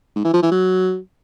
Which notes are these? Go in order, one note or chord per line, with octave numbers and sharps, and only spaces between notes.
G#2
E3
F3
E3
F#3